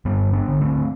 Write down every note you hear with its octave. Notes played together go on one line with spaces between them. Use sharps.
G2 G3 B3
B3 D4
D3
A3 C4